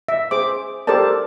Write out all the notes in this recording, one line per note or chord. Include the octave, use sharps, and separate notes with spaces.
E5
G#4 C5 D6
G4 A4 A#4 C5 D5 A5